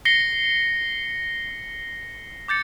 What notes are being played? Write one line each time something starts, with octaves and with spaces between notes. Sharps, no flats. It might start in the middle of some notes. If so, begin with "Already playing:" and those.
A#6 C7 C#7 G7
D6 G6 A6 C#7